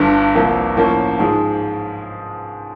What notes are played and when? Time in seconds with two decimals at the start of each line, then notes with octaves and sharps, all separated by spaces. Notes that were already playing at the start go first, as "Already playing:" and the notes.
Already playing: G1 G2 D3
0.35 C2 C3 F3 A#3
0.77 A2 F3 A#3 C#4
1.19 G#2 F3 G#3